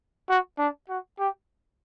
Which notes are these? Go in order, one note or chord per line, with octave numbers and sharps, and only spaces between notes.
F#4
D4
F#4
G4